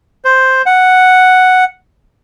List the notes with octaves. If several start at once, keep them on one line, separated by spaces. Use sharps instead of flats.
C5
F#5